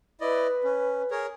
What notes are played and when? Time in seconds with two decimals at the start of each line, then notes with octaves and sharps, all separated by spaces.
0.21 E4 B4 D5 D#5
0.64 C#4
1.11 G#4 A#4 C#5